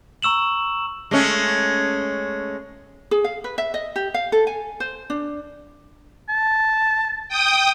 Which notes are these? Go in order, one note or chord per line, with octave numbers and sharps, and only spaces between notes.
A#5 C#6 E6 E7 F#7
G#3 A3 C#4
G#4
F5
B4
E5
D#5
G4
F5
A4
G#5
C5
D4
A5
G5 D#6